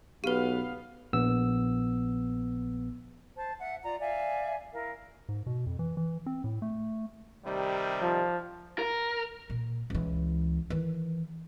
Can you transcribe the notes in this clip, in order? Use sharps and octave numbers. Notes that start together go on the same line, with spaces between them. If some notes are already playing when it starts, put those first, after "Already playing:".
B1 B3 G4 B4 F5
A#1 B3 E6
C5 A5
E5 F#5
F4 D5 A#5
D5 E5 F5 G#5
E4 A#4 F5
G#2
B2
F2
E3
E3
C4
A2
A3
C3 D#3 G3
F3
A#4
A#2
C#2 E3
D#3 E3